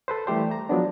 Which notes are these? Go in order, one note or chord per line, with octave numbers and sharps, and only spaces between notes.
A4 B4 C5
E3 G3 A3 G4 C5
A#5
F3 F#3 G#3 B3 D4